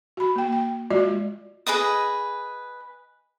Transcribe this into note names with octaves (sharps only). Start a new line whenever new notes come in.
F#4 B5
A#3 G5
G5
G#3 F4 F#4 D5 D#5
G#4 B4 D#5 D#6